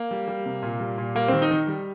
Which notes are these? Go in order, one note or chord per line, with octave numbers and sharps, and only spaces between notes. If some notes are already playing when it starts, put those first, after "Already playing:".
Already playing: A#3
G3
G3
C3
A#2
G3
A#2
G3 A#3
D#3 C4
D#4
D#3
G3